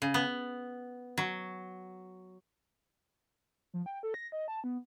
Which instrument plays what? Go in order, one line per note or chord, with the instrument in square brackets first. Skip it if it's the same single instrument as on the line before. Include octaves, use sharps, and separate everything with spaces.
[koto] C#3
B3
F#3
[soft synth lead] F3
G5
A4
A#6
D#5
A5
B3